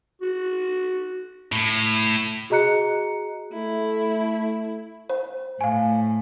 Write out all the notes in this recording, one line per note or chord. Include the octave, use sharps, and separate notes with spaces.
F#4
A2
F#4 G#4 D#5 A#5 F#6 C#7
A3 E4
C5
A2 F5 G#5